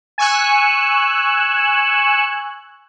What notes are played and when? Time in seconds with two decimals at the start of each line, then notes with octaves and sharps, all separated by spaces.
0.18 G#5 C#6 E6 F#6